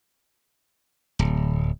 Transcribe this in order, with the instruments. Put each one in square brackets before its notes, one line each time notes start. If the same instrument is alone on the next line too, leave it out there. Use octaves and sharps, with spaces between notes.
[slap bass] D1